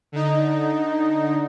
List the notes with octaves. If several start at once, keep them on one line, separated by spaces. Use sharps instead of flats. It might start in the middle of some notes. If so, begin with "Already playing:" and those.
D3 D#4